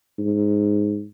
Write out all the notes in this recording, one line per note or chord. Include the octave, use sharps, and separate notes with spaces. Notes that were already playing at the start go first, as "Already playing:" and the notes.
G#2